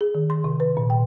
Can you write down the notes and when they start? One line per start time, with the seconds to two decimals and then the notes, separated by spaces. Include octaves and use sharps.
0.01 G#4
0.15 D#3
0.30 C6
0.44 C3
0.60 B4
0.77 A#2
0.90 G5